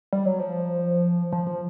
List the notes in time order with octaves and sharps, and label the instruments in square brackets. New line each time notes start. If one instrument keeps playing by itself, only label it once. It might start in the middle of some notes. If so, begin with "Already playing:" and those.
[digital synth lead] G3
F#3
F3
F3
F3